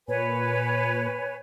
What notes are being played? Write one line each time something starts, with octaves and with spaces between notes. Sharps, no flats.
A#2 B4 C#5 G#5